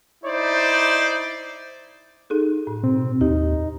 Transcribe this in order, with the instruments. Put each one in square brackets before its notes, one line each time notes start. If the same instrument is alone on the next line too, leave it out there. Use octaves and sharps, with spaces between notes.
[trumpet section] D#4 E4 C5 D5
[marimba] D#4 G#4 A4
A2
[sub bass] B2 [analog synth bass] C4
[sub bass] D#2 [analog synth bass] D#4 [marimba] G4